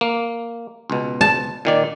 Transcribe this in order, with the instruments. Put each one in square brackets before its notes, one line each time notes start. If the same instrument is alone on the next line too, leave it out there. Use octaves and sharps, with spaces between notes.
[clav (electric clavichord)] A#3
C#2 B2
[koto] A5
[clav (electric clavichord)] A#2 D#3 D5